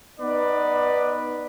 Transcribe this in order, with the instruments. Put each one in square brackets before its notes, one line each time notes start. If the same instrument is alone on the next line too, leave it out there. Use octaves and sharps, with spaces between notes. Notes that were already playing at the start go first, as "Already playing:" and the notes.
[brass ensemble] B3 D#4 B4 D5